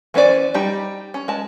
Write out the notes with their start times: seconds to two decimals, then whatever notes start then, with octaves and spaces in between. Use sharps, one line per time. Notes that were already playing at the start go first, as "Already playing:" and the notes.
0.14 E3 B3 C#4 C5 D5
0.54 G3 D#4 G4
1.14 C#4
1.28 G#3 A5